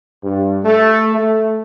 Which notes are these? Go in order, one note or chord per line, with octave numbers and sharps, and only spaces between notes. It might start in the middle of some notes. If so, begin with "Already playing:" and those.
G2
A3
A3